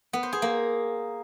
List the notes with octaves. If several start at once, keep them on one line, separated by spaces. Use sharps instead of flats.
B3
C5
G#4
A#3